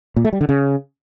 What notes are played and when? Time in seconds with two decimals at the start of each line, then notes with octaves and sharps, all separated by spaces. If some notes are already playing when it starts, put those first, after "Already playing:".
0.16 A#2
0.25 A3
0.33 G3
0.41 D3
0.49 C#3